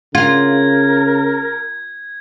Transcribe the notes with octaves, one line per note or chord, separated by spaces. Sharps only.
C#3 F4 A#4 G#6